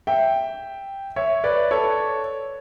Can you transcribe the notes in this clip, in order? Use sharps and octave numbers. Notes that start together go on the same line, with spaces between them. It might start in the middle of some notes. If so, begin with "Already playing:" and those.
E5 G5
C#5 E5
B4 D5
A4 C#5